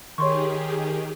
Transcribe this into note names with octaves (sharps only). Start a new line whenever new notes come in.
D#3 G4 G#4 C#5 C6 C#6